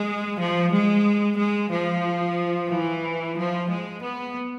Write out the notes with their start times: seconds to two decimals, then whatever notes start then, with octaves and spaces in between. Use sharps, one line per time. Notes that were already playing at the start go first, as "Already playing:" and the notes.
Already playing: G#3
0.39 F3
0.72 G#3
1.37 G#3
1.70 F3
2.69 E3
3.35 F3
3.68 G#3
4.01 B3